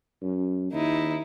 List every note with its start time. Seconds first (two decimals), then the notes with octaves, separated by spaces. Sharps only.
0.22 F#2
0.72 D#2 D#4 E4